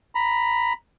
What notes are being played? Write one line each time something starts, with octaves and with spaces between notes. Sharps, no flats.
A#5 B5